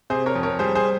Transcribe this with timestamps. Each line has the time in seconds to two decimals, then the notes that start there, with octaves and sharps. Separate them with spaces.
0.10 C3 G#4 C5
0.26 A#4 C#5
0.35 F2
0.43 A#4 C#5
0.59 G3 G#4 C5
0.75 G#4 C5